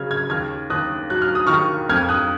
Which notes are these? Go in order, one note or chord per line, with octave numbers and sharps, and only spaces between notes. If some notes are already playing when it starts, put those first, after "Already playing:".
Already playing: C#3 F#3 F6 G#6
F6 G#6
D#2 F6 G#6
D#2 D#6 F#6
F#3 F#6
F6
D#6
D#3 C#6 F6
F2 F6 G#6
D#6 F#6